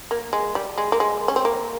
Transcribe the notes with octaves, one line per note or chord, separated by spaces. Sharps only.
A#3
G#3
G3
G#3
A#3
G#3
C#4
C4
A#3